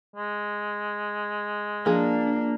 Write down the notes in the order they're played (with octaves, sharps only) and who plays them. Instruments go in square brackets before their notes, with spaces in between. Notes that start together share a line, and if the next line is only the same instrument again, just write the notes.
[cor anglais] G#3
[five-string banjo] F3 G#4 [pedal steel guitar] A#3 [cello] D4